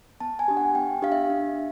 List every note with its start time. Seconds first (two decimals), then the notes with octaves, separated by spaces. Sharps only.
0.20 B3 A5
0.39 G#5
0.48 D4 G4
0.57 F#5
0.75 B3 G5
1.02 D4 G4 F5
1.12 E5
1.30 D4